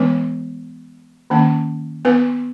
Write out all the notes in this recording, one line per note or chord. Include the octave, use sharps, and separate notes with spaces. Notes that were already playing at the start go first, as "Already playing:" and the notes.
Already playing: E3 G#3 B3 B4
D#3 A#3 C#4
B3 B4